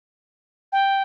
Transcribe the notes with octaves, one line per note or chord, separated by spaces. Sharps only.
G5